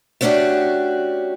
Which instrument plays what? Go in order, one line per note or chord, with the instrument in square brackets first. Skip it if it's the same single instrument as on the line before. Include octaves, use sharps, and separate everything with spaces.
[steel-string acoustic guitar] A3 B3 C#4 D4 F#4 G4